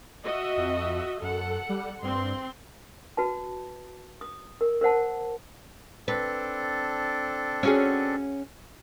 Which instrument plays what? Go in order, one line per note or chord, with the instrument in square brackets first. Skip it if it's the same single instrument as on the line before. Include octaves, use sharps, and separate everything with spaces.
[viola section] F#4 D#5 E5
[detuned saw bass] F2
[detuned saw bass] F#2 [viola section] A4 F#5
[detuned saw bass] G3
[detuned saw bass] G2 [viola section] C4 C6
[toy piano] F#4 B4 A5
D#6
A#4
A#4 C5 F#5 A5
[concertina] C4 D4 A4 [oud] B4
[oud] C#4 F#4 G#4